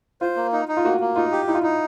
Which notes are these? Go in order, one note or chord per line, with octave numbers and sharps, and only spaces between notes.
F4 C5
A#3
D#4
D#4
F4
A#3 F#4
A#3
D#4 F4
G4
D#4 E4
F4
D#4 E4